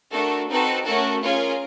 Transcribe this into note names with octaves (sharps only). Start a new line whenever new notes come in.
A3 D4 F#4 A4 A#4
C4 D#4 F#4 A4 B4
A3 C#4 F#4 A4 A#4
C#4 F4 G#4 A#4